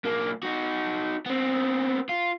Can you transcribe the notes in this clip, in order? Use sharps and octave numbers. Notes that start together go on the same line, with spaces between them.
B1 A#3
D#4 F#4
B3 C4
F4